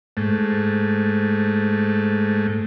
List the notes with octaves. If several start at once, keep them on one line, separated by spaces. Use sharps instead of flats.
G#2 A3